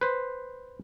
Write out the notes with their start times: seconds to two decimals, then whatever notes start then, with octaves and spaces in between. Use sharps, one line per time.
0.01 B4 C5